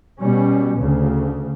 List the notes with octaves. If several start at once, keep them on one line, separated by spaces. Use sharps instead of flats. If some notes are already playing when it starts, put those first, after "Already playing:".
B2 G3 C#4
D2 C#3